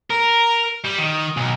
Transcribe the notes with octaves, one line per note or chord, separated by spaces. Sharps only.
A#4
G3
D#3
B1